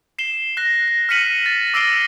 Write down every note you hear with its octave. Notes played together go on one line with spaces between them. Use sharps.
C7 E7 G7
F#6 A#6 C7
A#6
F6 A#6 B6 C#7 D#7 F#7
A6
D6 E6 A#6 C7 D7 G7